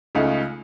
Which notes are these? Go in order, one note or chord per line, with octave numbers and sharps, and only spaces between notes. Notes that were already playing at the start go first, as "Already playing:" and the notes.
C#2 C#3 A3 D#4